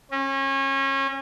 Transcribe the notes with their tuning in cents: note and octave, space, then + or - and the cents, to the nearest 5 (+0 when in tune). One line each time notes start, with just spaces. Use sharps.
C#4 -30